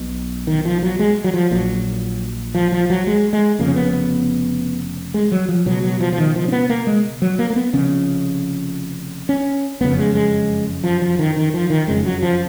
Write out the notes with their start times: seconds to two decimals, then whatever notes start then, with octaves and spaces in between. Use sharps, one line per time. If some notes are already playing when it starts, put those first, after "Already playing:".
Already playing: B1 B2
0.47 D#3
0.65 F3
0.83 F#3
0.99 G#3
1.24 F#3
1.34 F3
1.51 A#1 A#2 F#3
2.55 F3
2.72 F3
2.90 F#3
3.07 G#3
3.33 G#3
3.59 F1 F2 C#3 A#3
3.68 C#4
3.76 B3
3.93 B3
5.14 G#3
5.32 F#3
5.49 F3
5.66 C#2 B2 F#3
5.84 F#3
6.00 F3
6.13 F3
6.18 D#3
6.36 F3
6.48 C#4
6.52 B3
6.69 A#3
6.87 G#3
7.22 F#3
7.39 A#3
7.50 A#3
7.56 B3
7.73 F1 F2 C#3 C#4
9.29 C#4
9.80 F#1 F2 C#3 B3
9.91 A#3
9.98 G#3
10.15 G#3
10.84 F3
11.02 F3
11.19 D#3
11.36 D#3
11.54 F3
11.70 D#3
11.87 F#1 F2 C#3 G#3
12.05 F#3
12.22 F3